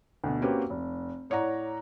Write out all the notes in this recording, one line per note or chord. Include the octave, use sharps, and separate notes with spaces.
D2 B2
A#3 C4 C#4 F#4 G4 B4
F1
A2 C#5 D5 F#5 A#5